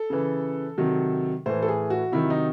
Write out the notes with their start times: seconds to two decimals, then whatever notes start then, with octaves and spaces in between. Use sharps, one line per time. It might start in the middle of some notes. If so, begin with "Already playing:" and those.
Already playing: A4
0.10 C#3 E3
0.78 C3 D#3 F#3
1.46 A2 E3 C5
1.62 A4
1.68 G#4
1.90 F#4
2.12 C3 D#3 F#3 E4
2.30 D#4